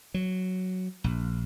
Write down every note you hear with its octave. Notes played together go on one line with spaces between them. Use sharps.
F#3
A#1